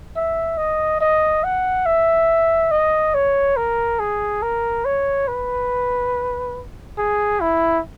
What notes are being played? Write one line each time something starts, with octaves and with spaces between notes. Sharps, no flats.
E5
D#5
D#5
F#5
E5
D#5
C#5
A#4
G#4
A#4
C#5
B4
G#4
E4